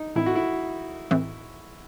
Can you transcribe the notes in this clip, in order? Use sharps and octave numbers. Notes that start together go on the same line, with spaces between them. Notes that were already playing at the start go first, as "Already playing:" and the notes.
Already playing: D#4
A2 E3 C4 E4
F#4
E4
A2 E3 C4